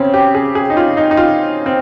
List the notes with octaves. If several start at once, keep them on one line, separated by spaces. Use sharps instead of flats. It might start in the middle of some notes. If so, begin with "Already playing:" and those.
Already playing: C#3 C4 C#4
G4
G#4
G#4
D#4
F4
D#4
D#4
F4
C4